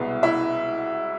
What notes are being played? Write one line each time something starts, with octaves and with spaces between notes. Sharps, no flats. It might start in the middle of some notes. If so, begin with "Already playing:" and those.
Already playing: C2 B2 G#3 B3
E4 E5